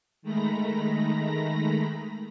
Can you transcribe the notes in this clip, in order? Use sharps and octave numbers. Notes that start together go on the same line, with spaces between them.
D#3 G#3 A3 A#5 B5 A#6